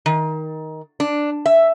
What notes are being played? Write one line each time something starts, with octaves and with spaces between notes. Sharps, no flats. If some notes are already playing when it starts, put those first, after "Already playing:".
D#3
D4
E5